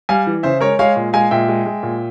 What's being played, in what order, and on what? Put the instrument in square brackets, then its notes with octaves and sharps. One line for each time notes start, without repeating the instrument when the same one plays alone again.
[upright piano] G3 F5 G#5
E3
C#3 C5 E5
G#3 A#4 C#5
G#3 C#5 F5
A#2
G#3 F5 G#5
A#2 E5 G5
G#3
G#3
A#2